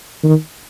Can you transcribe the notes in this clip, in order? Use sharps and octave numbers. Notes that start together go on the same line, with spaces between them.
D#3